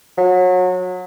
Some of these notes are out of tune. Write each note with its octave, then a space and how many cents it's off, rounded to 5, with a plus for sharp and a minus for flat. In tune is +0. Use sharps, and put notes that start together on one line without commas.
F#3 -25